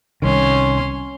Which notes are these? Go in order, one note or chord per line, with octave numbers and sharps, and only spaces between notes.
C2 D#3 C#4 C6